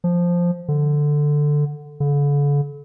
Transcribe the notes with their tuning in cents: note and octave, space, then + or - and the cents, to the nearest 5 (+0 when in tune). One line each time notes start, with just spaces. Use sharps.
F3 +0
D3 +5
D3 -40